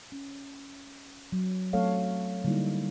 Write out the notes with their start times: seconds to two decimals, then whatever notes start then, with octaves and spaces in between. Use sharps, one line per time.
0.12 C#4
1.32 F#3
1.73 F#3 A3 C4 A4 C#5 F5
2.44 D3 G3 A#3 D#4 E4